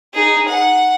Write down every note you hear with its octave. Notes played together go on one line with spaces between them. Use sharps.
D#4 G#4
F#5